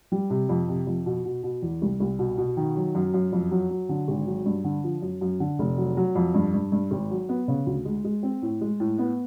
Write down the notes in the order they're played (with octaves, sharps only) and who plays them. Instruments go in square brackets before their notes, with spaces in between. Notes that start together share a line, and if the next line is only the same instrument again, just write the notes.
[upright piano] G3
C3
F2
C3
F2
B2
B2
B2
E2
C2
C2
B2
B2
D#3
F#3
F#2
F#2
F2
F#3
F#3
D3
G#1
F#3
G2
D3
F3
F#2
F#2
D3
F1
F#3
F#3
F2
G2
G2
G2
G#1
F#3
B3
C#3
D2
G#3
G#3
C4
A2
G#3
A2
B3